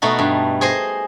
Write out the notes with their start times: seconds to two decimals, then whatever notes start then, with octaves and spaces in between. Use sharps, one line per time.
0.02 B2 A3 D#4 F#4
0.19 G2
0.61 G#4 C5 D#5